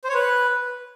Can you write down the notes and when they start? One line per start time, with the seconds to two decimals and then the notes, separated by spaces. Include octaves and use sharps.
0.04 C5
0.09 C#5
0.14 B4